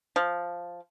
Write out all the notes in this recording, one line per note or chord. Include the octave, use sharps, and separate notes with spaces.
F3